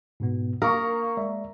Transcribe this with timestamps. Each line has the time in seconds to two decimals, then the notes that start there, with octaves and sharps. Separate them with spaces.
0.20 G#2 B2 B3
0.62 A#3 A#4 F5 C#6 D#6
1.17 G#3 D5 E5